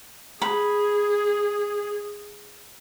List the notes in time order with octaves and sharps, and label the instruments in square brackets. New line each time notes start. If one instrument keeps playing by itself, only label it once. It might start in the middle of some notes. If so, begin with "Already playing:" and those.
[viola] G#4 [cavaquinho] B5